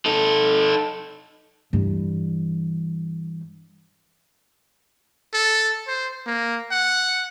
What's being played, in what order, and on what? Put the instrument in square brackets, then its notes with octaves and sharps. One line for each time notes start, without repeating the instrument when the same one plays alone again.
[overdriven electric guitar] D#4 A4
[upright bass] G2 E3
[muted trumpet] A4
C5
A#3
F#5